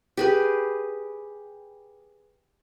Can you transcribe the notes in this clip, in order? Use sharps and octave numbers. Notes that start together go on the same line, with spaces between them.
G4 G#4 B4